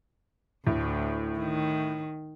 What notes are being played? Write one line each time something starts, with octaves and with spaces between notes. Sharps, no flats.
D2 A2
D#3